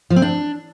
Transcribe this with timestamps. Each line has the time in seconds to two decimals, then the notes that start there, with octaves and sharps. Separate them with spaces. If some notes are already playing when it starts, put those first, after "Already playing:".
0.10 F3
0.16 C4
0.22 D4